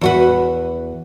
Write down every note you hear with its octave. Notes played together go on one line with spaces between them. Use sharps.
E2 F#4 B4